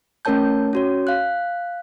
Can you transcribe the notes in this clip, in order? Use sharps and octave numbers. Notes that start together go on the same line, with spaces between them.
A3 C#4 A#4 C#5 A5 G6
C#4 F#4 C#5
F5 F#6